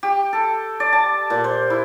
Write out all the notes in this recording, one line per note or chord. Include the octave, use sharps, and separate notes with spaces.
G4
A4
D5
A5
A#2
C5
E4